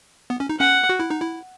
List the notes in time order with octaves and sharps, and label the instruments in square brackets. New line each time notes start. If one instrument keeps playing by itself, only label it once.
[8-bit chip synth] B3
C#4
D#4
[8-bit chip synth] C#4 [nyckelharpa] F#5
[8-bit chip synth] F#4
E4
D#4
E4